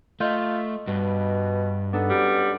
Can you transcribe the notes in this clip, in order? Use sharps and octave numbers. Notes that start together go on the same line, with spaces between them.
A3 F4 D#5 G6
G2 B2
B3 D4 D#4 A4
F#2 G3